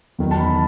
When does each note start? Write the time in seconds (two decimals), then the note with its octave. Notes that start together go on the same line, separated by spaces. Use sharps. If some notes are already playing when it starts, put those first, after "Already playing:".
0.19 E2 D#3 F#3
0.31 A5
0.40 B5